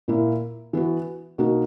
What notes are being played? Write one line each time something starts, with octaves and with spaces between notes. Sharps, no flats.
A#2 A#3 E4
E3 B3 F#4
B2 A#3 D#4 F#4